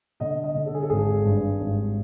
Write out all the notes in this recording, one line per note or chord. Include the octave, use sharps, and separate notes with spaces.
D3 D#5
D#5
D3
A4
G#4
A4
G#1 G#4
G2
G#1